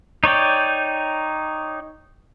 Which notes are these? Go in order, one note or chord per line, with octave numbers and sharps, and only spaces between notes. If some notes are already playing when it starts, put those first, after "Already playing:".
D#4 C#5 D5 G5